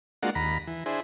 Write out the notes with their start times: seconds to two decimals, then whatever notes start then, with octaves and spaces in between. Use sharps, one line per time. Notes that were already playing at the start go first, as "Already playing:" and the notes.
0.23 G#3 A#3 D4 F4 F#4 F#5
0.35 D#2 A#5 B5
0.67 E3
0.86 D4 E4 G#4 C5